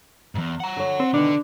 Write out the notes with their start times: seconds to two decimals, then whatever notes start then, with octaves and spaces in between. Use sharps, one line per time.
0.35 E2 G#2
0.60 F#5 A#5
0.77 D3 C#5
1.00 C4
1.14 B2 D3 D#3 D4 D#4